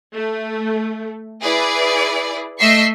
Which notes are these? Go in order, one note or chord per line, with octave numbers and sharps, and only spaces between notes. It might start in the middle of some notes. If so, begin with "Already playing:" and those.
A3
E4 G#4 B4 D5
A3 D#5 E5 C#6 C7